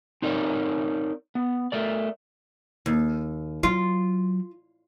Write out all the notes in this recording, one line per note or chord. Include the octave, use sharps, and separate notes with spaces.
C4 D#4 A#4 C#5 D5
B3
A3 A#4 D5
D#2
F#3 F4